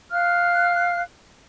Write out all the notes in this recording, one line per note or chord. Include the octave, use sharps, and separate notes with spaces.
F5 F6 F#6